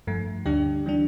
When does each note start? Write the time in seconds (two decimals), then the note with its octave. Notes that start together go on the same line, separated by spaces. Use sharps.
0.07 G2 F3 A3
0.46 D2 D3 G3 D4 G4
0.86 E3 G3 D4